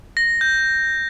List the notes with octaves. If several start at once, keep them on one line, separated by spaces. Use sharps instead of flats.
A#6
G6